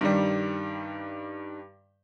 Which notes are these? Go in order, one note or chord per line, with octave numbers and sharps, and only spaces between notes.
G2 D#3 G3